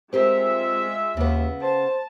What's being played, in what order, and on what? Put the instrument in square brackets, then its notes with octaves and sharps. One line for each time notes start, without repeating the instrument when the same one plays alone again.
[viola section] G#3 F4 E5 [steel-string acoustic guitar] C4 G4 A#4
[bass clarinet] D#2 [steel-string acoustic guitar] C#3 B3
[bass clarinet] C5 [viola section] A5